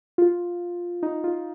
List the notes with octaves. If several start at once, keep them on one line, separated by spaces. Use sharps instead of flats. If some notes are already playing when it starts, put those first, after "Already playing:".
F4
D#4
F4